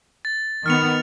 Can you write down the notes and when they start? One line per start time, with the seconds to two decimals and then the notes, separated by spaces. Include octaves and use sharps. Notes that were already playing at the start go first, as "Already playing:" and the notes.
0.25 A6
0.66 D#3 B3 F6 C#7 F7